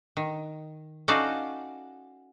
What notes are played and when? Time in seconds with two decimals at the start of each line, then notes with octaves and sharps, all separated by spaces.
0.17 D#3
1.08 C#4 D#4 F#4 A4 D5 F5